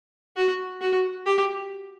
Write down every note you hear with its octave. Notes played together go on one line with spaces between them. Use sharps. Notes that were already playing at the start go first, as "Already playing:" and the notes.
F#4
F#4
G4